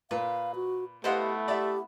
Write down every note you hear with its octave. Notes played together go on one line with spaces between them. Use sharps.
A#2 B4 F5
F#4
A3 B3 E4 G4 C5 D#5 F5 F#5
G4 D5 E5